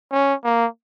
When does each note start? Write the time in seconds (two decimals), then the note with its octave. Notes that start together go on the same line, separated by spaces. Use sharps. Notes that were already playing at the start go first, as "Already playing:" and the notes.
0.12 C#4
0.44 A#3